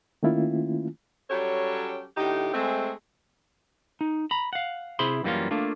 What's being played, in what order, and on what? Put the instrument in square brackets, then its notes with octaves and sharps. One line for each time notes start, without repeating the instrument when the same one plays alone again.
[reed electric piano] D#3 A3 A#3 C#4 E4 F4
[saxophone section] F#3 G3 C#4 G4 A4 C#5
A2 D3 D#4 G4
G#3 A3 C4
[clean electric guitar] D#4
A#5 B5
F5 F#5
C3 E4 G#4 C5 B5 C6
F#2 E3 G3 A#3 C#4 F4
A3 A#3 D4 F4